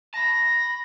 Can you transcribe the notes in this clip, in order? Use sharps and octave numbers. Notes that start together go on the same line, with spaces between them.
A5 B5 A#6